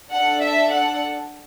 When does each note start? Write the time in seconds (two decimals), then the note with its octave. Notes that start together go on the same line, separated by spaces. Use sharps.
0.12 D4 A4 F#5
0.42 E5
0.71 F#5